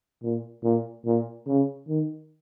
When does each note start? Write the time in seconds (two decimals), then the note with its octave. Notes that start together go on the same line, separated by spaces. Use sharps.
0.23 A#2
0.64 A#2
1.06 A#2
1.46 C#3
1.88 D#3